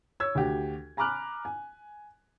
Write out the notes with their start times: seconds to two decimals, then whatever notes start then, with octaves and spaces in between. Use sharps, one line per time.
0.20 C#5 E6 G#6
0.35 D2 F#4 G4
0.97 G#5 A#5 B5 D6 F6 F#6
1.45 G#5